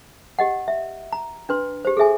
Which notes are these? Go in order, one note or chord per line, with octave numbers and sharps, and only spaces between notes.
G4 D#5 F#5
E5
A#5
D4 B4 C6
G4 C5
G#4 A4 E5 G#5